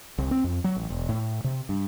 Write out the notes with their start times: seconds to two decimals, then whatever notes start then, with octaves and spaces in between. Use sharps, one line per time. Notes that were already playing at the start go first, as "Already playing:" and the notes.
0.18 C2
0.31 C4
0.44 F2
0.64 F#3
0.76 A1
0.90 E1
1.09 A2
1.44 C3
1.69 G2